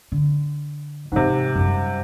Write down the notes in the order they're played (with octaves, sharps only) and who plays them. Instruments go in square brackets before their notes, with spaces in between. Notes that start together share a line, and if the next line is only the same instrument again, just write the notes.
[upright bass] D3
[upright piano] G#2 C3 [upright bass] E3 D#4
[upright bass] F#2 G3